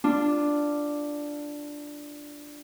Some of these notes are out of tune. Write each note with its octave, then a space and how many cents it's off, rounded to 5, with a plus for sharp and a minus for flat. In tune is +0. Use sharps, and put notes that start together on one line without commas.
D4 +0 F4 -10